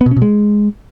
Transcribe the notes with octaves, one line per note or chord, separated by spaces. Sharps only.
B3
B2
C#4
B2
G#3